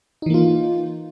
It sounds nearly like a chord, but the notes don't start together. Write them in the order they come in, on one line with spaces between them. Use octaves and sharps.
D#4 E3 A#3 F4